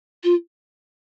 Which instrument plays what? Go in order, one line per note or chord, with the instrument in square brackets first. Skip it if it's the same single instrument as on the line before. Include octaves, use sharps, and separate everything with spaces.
[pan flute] F4